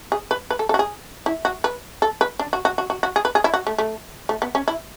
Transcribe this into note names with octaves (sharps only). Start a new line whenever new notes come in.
G#4
B4
B4
A4
A4
F#4
G#4
E4
F#4
B4
A4
B4
D4
F#4
F#4
F#4
F#4
F#4
G#4
B4
G#4
E4
F#4
A3
A3
A3
B3
C#4
E4